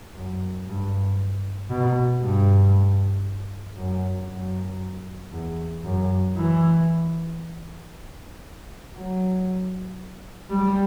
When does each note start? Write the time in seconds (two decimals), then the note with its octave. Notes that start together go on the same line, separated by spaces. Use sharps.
0.15 F#2
0.66 G2
1.70 B2
2.22 G2
3.77 F#2
4.29 F#2
5.32 E2
5.84 F#2
6.36 E3
8.95 F#3
10.50 G3